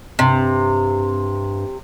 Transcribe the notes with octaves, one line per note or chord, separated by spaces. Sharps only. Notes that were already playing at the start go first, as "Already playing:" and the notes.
G2 C3